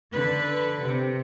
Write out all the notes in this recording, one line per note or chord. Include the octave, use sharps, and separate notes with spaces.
D3 B4
C3